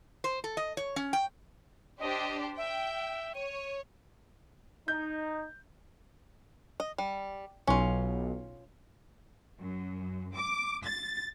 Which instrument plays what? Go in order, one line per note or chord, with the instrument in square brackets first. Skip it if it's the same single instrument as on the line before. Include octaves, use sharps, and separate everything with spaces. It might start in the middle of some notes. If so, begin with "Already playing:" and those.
[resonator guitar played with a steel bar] C5
A4
D#5
C#5
C#4
G5
[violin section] D4 G4 C5 [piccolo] D#5
[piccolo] E5 [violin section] G5
[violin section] C#5 [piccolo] D#7
[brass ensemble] D#4 [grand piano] G6
[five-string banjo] D#5
G3
[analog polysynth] B1 [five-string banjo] C#4 F4
[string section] F#2
D6
A6